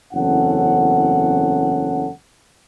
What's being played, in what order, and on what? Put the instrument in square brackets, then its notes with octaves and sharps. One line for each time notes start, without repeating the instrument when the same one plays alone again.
[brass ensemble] F#1 E2 C4 C#4 A4 F#5